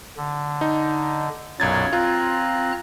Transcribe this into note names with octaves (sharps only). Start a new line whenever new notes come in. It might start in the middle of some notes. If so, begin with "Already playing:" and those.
D3
D#4
B1 F#2 A#2 F#3 G#6 A6
C4 F4 A#5 F#6